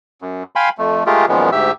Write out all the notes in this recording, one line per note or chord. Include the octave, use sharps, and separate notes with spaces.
F#2
F5 G5 G#5 B5 C6
F2 A3
G#3 A3 F4 G4 G#4 A#4
F#2 A#2 D#3 F3 G#3 B3
D2 G#2 G4 E5 E6